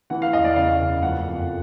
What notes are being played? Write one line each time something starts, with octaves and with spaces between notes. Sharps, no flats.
E3 F#5
F5
E2 D#5
D5
C#3 F5
F#1
F3 F#5
F2